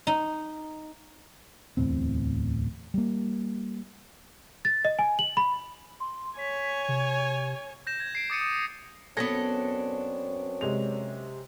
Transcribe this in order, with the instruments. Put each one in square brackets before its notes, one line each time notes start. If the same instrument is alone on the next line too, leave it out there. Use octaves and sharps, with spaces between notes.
[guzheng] D#4
[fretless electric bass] D1 E2 A2 C4
G3 A#3
[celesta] A6
D#5
G#5
F#7
B5
[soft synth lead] C6
[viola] C#5 G#5 [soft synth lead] B6
[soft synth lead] C3
[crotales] G6 A#6 E7
G#6
C7 D7
D6 D#6 A6 C#7 D#7
D#6
[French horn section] F#2 C4 C#5 [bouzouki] B3 D4 A4 [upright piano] G#6 A#6
[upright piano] C3 G#3 F7